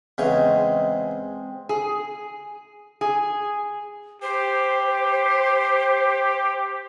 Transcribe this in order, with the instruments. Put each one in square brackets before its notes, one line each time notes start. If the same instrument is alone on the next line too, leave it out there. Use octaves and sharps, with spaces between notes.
[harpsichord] E2 C#3 C#6 [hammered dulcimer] G#3 C4
[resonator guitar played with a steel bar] G#4
G#4
[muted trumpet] G4 [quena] C5